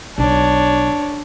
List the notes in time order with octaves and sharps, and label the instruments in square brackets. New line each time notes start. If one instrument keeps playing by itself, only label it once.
[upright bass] B1 [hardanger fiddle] D4 C#5